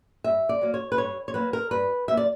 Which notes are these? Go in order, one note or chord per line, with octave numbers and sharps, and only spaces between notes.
G2 E5
D5
F#3 A#3
C#5
B4
G2 C#5
C#5
F#3 A#3 B4
A#4
G2 B4
F#3 A#3 E5
D5